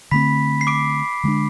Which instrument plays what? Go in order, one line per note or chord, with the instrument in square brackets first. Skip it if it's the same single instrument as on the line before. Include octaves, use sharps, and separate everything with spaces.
[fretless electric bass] D3 A3 C4 [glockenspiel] B5 B6
[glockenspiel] C7
D6 D7
[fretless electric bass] D3 G#3 D4